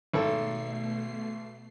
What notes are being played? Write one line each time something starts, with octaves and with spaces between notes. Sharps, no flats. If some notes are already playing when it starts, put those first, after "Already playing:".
G#1 B2 A3 A4 C7